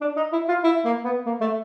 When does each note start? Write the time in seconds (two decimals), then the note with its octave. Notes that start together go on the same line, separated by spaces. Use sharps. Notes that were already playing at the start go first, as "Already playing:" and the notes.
0.01 D4
0.16 D#4
0.33 E4
0.48 F4
0.64 E4
0.85 A#3
1.04 B3
1.26 A#3
1.41 A3